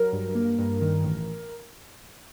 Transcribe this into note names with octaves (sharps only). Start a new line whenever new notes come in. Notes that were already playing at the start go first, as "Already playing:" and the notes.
Already playing: F#3 A#4
G2
A#3
G2
D#3
A1